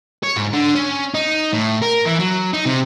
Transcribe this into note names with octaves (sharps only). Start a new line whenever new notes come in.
C#5
G#2
D3
C#4
D#4
A2
A#4
E3
F#3
D#4
C3